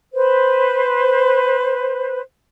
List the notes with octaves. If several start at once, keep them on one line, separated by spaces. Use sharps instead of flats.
B4 C5